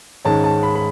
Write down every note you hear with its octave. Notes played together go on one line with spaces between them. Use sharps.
G#2 D#3 G#3 C#4 A5
A5
B5
B5